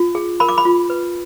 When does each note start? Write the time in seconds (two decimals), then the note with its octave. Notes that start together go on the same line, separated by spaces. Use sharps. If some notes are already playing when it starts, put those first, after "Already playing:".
Already playing: F4
0.15 G#4
0.40 A#4 B5
0.49 D6
0.58 B5
0.65 F4
0.90 B4